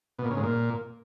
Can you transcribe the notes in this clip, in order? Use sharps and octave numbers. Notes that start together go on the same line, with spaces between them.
B2
A#2
C#3
G#2
A#2